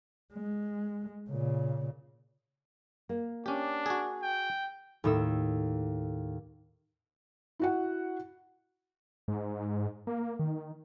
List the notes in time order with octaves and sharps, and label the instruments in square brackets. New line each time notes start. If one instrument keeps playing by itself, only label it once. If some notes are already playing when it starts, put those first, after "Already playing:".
[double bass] G#3
A#2 C#3
[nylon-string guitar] A#3
[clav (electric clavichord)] C#4 G4 [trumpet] D4
[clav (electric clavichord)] F#4 G#4
[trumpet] G5
[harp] D#2 A2 D#4 E6
[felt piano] E4 F#4 F#5
[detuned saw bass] G#2
A#3
D#3